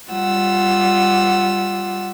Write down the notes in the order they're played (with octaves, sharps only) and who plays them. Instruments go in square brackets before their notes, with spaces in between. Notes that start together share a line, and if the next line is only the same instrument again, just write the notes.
[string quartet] G3 F4 F#5 E6